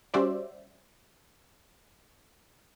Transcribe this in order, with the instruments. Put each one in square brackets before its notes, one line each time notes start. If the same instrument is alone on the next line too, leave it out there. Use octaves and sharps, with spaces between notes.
[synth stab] G3 C#4 F#4 C5 D5 E5